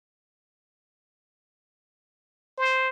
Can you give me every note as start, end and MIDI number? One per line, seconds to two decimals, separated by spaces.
2.58 2.89 72